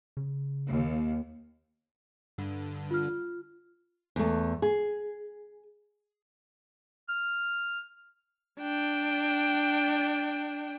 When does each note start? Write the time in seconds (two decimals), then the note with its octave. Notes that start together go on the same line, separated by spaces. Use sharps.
0.17 C#3
0.68 D#2
2.38 G2 D3
2.91 F4 F6
4.16 E2 A3
4.62 G#4
7.09 F6
8.60 D4 G5